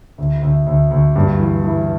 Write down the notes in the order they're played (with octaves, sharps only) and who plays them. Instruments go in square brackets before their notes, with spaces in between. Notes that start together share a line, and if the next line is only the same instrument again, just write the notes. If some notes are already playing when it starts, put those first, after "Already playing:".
[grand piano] D2
D2
D2
D2
G2
E3
E3